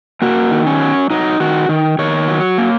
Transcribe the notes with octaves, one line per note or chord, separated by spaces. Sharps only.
A#3 F#4
D#3
C#4
F#3
F#3 D#4
D#3 F#4
D#3
D#3 C#5
F#3
A#3